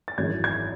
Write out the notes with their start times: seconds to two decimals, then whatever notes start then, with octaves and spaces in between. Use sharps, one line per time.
0.08 A6
0.18 G#1 F#2 E3 G#3 G#6
0.44 G#6